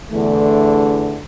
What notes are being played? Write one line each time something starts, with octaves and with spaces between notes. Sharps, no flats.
E2 D3 A3